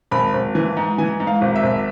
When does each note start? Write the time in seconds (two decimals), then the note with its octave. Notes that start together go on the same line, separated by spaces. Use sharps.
0.11 G#1 B5
0.34 G#1
0.55 E3
0.77 G#2
0.98 E3 G#5
1.20 G#2
1.27 F5
1.41 G#1
1.56 E5
1.63 G#1